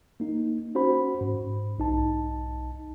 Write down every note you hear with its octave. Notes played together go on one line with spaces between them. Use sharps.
A#3 D#4
C#4 F#4 C5 B5
G#2
B1 D#4 A5